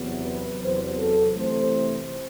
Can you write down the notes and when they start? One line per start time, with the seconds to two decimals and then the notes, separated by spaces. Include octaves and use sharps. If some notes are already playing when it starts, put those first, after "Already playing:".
Already playing: E2 C3 F#3 B3
0.22 B4
0.60 E2 C3 F#3 C5
0.97 A4
1.35 C3 E3 A3 C4 C5